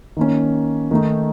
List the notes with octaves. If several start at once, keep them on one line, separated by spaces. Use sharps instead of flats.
D#3 A#3 C#4
D#3 A3 D#4